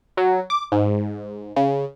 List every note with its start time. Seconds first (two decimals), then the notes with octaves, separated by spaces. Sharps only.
0.17 F#3
0.50 D6
0.72 G#2
1.56 C#3